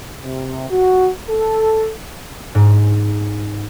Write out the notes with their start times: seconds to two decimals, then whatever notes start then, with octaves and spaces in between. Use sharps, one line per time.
0.22 C3
0.69 F#4
1.27 A4
2.55 G#2